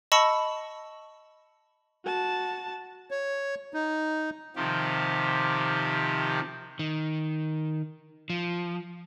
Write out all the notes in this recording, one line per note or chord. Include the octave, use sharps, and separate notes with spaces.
D#5 A5 B5 C#6 E6 C#7
F#4 A5
C#5
D#4
C3 D#3 F3 G4
D#3
F3